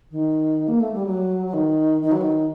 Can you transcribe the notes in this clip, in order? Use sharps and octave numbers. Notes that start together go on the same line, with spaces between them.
D#3
A#3
A3
G3
F#3
F#3
D#3
D#3
F#3
D#3